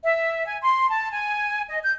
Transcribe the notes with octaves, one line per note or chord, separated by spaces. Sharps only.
E5
G#5
C6
A5
G#5
D#5
G6